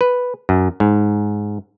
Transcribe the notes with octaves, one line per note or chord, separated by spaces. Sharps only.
B4
F#2
G#2